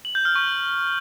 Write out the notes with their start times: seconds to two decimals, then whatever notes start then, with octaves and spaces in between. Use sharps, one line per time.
0.05 F#7
0.15 G6
0.25 F6
0.35 C#6